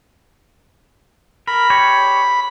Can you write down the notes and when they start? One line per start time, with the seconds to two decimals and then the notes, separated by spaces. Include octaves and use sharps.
1.47 A#4 B5
1.70 G4 C#5